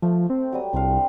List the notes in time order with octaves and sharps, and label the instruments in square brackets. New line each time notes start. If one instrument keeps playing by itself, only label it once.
[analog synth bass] F3 [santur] A3
[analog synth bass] C4
[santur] F#3 G3 D#6
[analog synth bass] C2 [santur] C4 D4 F5